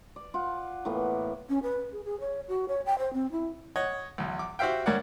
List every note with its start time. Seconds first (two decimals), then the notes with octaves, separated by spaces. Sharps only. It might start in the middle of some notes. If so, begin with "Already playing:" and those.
0.16 D5
0.34 F4 F#5
0.85 A2 E3 A#3 B3
1.49 C#4
1.63 B4
1.92 G#4
2.05 G#4
2.20 C#5
2.49 F#4
2.68 C#5
2.86 G5
2.99 C5
3.14 C4
3.32 E4
3.76 C#5 D#5 F#5
4.18 B1 E2
4.39 D6
4.59 F#4 G4 C5 E5 F5 G5
4.86 G2 A#3 C#5 D5 F#5